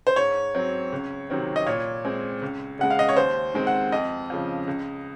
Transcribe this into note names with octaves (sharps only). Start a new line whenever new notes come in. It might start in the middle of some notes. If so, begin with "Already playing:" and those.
C5
G#2 C#5
F#3 C4
C#2
C3 D#3 F#3 C4
D#5
A#2 C#5
G#3 C4
C#2
C#3 G#3 F#5
F5
D#5
C#5
D#2 C5
D#3 G#3 C4
F#5
F2 D#5
C#3 F3
C#2